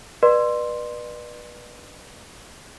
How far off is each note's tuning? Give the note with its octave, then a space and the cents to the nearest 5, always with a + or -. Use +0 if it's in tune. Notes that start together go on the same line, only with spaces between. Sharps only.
B4 -25 D5 +40 C6 +0